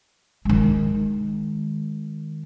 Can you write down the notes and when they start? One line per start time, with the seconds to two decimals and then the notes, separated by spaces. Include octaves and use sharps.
0.45 D#3 G#3